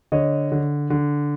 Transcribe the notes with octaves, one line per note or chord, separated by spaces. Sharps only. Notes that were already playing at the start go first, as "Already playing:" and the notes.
D3 C#5 D#5
D3
D3